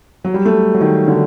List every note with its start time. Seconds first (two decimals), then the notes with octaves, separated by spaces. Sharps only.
0.24 F#3
0.34 G3
0.45 A3
0.74 F#3
0.81 D#3
1.08 D3